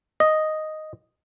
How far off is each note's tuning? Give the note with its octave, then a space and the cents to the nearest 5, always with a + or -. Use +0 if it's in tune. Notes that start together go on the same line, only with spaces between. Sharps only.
D#5 +0